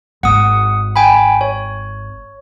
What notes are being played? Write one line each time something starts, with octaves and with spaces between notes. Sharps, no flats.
G#1 F#5 D#6
G5 G#5 B5
C#5